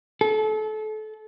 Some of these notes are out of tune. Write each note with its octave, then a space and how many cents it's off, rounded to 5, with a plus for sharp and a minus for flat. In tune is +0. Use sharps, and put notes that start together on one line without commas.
A4 -30